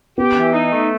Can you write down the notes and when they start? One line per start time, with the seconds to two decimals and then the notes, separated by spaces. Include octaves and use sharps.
0.18 B3 G4
0.36 E3
0.53 D#4
0.72 A3